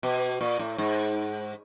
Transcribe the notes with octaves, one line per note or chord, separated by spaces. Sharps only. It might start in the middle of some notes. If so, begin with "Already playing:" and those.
B2
A#2
A2
G#2